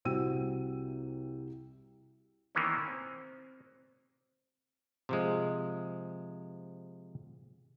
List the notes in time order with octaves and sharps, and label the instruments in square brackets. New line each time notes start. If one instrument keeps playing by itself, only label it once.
[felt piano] C2 C3 F#4 G5 E6 D#7
[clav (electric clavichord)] D#3 E3 A#3 B3 C#4
C4
C3 F3 G#3